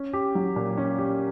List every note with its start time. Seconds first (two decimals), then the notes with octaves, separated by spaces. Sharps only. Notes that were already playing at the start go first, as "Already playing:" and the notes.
Already playing: C#4
0.13 G4
0.35 F#3
0.56 A#2
0.77 C#4
0.98 G4